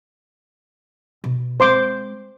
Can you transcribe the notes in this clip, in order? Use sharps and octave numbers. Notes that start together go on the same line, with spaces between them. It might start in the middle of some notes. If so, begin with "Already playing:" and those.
B2
G#3 C4 C5 C6 D6